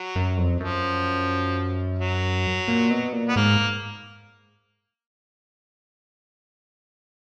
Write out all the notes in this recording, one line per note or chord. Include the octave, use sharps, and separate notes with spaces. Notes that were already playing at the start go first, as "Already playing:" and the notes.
Already playing: F#3
F#2
F2
F#2 F3
F#3
A#2
B2
A#2
B3
G#2 A#3